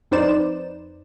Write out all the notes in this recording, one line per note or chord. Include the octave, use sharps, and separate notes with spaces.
F2 D#4 B4 C5 D5 E7